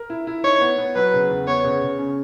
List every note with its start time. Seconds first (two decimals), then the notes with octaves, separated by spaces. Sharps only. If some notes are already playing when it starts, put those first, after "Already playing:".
Already playing: A#4
0.10 E4
0.27 E4
0.44 D#4 C#5
0.61 B3
0.78 B3
0.95 F#3 B4
1.13 C#3
1.30 E2
1.47 B3 C#5
1.64 C#3
1.81 C#3
1.99 C#4